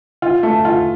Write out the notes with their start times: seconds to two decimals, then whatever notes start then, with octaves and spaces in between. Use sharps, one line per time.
0.22 F4
0.43 A3
0.65 F4